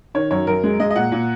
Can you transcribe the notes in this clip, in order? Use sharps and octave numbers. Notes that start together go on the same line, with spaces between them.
D#3 C#5
F#2 C#5
F#2 A#4
G#3
G#3 D#5
D#5
A#2 F#5
A#2